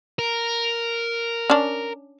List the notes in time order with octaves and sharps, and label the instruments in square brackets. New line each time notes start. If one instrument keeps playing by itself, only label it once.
[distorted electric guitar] A#4
[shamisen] C#4 D4